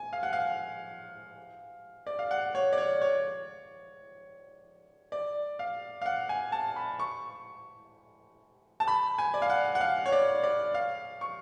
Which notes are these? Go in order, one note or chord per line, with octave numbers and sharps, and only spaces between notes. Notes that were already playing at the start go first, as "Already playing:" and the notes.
Already playing: G#5
F5
F#5
F5
D5
F5
F#5
C#5
D5
C#5
C#5
D5
F5
F5
F#5
G#5
A5
B5
C#6
A5
B5
G#5
D5
F5
F#5
F#5
F5
C#5
D5
D5
F5
C#6